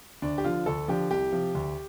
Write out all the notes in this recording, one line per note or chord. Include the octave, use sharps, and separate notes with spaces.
D2 D4
G4
D3 F3 F4
D2 A4
D3 F3 G4
C2 G4
C3 F3
D2